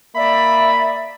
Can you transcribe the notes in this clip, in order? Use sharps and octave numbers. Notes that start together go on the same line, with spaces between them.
A#3 D5 E5 B5 D#6